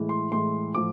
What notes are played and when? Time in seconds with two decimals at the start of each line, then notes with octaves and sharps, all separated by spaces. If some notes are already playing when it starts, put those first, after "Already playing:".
Already playing: A2 E3 G#3
0.09 C6
0.31 A2 E3 G#3 C6
0.75 A2 F3 D6